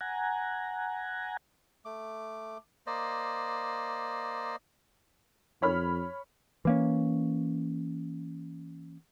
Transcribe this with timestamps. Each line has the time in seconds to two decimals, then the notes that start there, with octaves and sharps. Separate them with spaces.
0.01 F#5 G#5 A#5
1.85 A3 D6
2.87 A#3 C5 D5 D#5
5.62 F2 C#5 B5 F6
6.65 E3 A#3 C#4